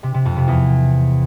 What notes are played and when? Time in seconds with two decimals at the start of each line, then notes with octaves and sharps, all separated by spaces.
0.03 C3
0.14 C3
0.25 F2
0.37 C3
0.48 E2